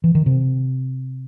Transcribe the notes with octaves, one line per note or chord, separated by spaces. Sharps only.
E3
D#3
C3